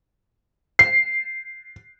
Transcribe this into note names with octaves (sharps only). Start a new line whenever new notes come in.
C7